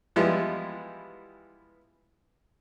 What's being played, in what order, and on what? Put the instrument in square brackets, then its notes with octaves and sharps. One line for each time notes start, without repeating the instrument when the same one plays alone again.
[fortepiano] E3 F3 G3 G#3 B3 E4